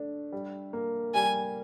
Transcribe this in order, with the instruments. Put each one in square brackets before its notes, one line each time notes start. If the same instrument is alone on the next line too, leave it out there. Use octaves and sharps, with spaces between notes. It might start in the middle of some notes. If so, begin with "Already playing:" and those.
Already playing: [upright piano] A3 D4
G3
A#3
[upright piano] G3 [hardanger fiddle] G#5